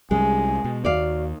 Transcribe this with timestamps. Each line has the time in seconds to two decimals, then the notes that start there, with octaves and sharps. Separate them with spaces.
0.11 C2 G3 G#3 C#4 G#5
0.64 B2
0.85 D#2 F#4 D5 F5